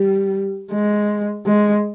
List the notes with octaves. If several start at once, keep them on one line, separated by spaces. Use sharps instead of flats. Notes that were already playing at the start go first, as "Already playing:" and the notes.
Already playing: G3
G#3
G#3